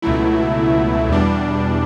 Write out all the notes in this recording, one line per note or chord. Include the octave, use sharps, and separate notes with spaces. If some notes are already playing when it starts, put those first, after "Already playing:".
C#2 B2 F#3 A3 E4
E2 B2 G3 D4